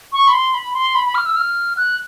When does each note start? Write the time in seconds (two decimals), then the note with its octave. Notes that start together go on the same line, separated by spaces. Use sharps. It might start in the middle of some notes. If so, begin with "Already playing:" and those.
0.13 C#6
0.28 B5
0.33 C6
0.54 B5
0.74 C6
0.95 B5
1.06 B5
1.15 F6
1.26 E6
1.36 F6
1.77 F#6